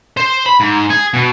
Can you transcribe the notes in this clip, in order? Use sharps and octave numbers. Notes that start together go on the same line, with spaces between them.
C5
B5
G#2
G#4
B2